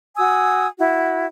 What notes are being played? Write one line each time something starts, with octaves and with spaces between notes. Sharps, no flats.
F#4 G#5 D#6 E6
E4 F#4